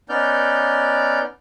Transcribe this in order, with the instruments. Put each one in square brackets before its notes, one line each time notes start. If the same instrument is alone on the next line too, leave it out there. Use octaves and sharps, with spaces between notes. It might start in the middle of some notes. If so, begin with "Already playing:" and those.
[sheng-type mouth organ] B3 C#4 D#4 D5 F6 G6